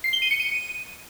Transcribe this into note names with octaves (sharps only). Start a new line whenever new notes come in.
C7
G7
D#7
C#7
D#7